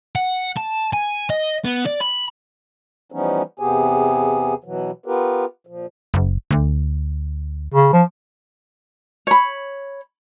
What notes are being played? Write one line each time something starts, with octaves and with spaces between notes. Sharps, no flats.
F#5
A5
G#5
D#5
B3
D5
B5
E3 F3 G3 B3 C#4 D#4
E2 C3 B3 G4 G#4 G#5
B2 E3 F#3
B3 F4 G4 A#4 B4
A#2 F3
F#1
D2
C#3
F3
C#5 B5